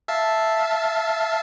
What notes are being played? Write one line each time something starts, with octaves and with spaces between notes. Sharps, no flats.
E5 F5 A5